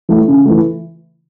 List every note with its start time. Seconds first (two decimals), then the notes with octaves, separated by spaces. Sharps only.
0.09 E3 A3
0.28 C#3
0.46 E3 A3